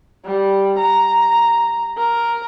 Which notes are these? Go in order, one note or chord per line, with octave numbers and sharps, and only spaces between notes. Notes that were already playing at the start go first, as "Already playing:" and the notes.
G3
A#5
A#4